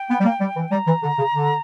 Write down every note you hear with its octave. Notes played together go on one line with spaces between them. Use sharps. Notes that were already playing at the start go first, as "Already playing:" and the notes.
Already playing: G5
B3
G3
A#3
G3
E3
G3 A#5
E3
D3
C#3
D3